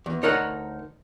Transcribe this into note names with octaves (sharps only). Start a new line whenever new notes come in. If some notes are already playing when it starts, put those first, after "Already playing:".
E2
D2 D#4 A#4 C#5 F#5